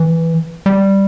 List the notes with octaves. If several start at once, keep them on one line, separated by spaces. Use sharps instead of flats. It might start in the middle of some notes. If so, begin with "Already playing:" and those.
Already playing: E3
G3